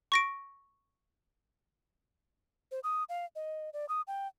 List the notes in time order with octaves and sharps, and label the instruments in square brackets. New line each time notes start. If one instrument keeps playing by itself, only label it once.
[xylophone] C#6 A#6 D7
[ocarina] C5
D#6
F5
D#5
D5
D#6
G5